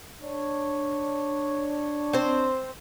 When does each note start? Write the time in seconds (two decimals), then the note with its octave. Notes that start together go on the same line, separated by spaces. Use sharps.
0.22 D4 C#5
2.13 C4 C5